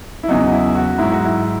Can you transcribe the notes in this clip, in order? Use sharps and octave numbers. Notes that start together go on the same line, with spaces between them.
E4
E2 C#3 F#3 D#4
E4
F#4
G#2 F#3 E4
F#4
E4